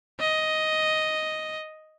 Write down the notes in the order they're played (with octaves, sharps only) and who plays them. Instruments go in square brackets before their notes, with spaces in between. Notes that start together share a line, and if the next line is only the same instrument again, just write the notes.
[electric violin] D#5